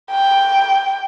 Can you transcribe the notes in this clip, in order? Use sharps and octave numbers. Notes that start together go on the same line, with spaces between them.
G5